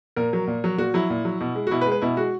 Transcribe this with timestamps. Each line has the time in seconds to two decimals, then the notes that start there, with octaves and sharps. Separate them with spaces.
0.16 A#2 A#4
0.33 F#3
0.47 A#2
0.64 F#3
0.78 A#2 F#4
0.94 F#3 E4
1.10 A#2
1.25 F#3
1.41 B2
1.55 G#3
1.67 F#4
1.71 B2 E4
1.81 B4
1.86 G#3
1.92 B4
2.02 B2 E4
2.17 G#3 F#4